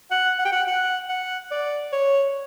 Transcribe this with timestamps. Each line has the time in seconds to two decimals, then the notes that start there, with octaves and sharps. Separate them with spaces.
0.11 F#5
0.39 F#5
0.45 G5
0.52 F#5
0.67 F#5
1.09 F#5
1.51 D5
1.92 C#5